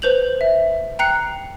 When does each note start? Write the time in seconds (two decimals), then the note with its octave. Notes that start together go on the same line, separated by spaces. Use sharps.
0.02 B4 C5 G6 F7 F#7
0.41 E5
0.99 G5 A#5 F#6 C7 C#7